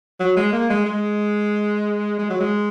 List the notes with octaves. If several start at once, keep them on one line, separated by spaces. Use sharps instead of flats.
F#3
G#3
A#3
G#3
G#3
G#3
F#3
G#3